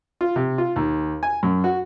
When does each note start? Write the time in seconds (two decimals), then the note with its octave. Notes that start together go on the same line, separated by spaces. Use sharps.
0.21 F4
0.36 C3
0.58 F4
0.76 D#2
1.23 G#5
1.43 F#2
1.64 F#4